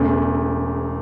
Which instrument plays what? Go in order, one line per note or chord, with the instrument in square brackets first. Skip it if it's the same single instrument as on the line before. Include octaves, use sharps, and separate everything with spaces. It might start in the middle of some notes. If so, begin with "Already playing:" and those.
Already playing: [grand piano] E1 E2 C#3 A3